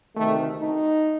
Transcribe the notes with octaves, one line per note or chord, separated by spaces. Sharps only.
D2 C3 D#3 A3
D#4